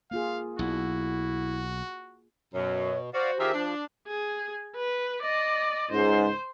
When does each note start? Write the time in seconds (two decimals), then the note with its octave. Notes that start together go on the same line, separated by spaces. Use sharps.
0.11 A#3 F4 G#4 F5
0.59 B1 E4 F#4
2.54 F#2 B2 C#5
3.14 F#4 C5 D5 F5
3.39 D#3 F4 G4 G#4 A#4 E5
3.53 F3 D4
4.07 G#4
4.76 B4
5.22 D5 D#5
5.91 C#2 G#2 C5